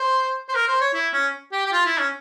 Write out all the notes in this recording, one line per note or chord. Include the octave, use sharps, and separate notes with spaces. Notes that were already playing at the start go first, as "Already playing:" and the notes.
Already playing: C5
C5
A#4
C5
C#5
E4
C#4
G4
G4
F4
E4
C#4